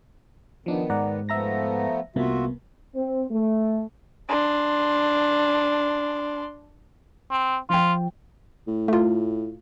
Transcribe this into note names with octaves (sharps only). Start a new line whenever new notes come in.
D#3 F3 B3 D4 D#4
G#2 D5 F#5 A#5
F3 A3 B3 E5 A#5 A#6
C2 C3 A#3 B3 F4 F#4 E5
C4
A3
D4 C6
C4
F3 F4 G5
A2
A3 F4